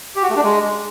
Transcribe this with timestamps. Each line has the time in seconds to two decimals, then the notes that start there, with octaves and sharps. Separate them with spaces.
0.16 G4
0.23 F#4
0.30 A3
0.37 D4
0.43 G#3